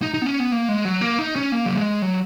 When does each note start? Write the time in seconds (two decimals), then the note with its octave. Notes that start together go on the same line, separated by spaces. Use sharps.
0.02 D#4
0.14 D#4
0.22 B3
0.26 C#4
0.40 B3
0.52 A#3
0.68 G#3
0.85 F#3
1.01 A#3
1.19 D#4
1.36 C#4
1.52 A#3
1.66 F#3
1.77 G#3
2.02 F#3